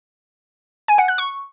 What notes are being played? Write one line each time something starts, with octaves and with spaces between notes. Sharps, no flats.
G#5
F#5
F#6
C#6